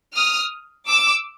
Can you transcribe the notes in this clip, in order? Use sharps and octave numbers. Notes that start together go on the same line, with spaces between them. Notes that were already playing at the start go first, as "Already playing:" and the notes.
D#6 F6
D6 E6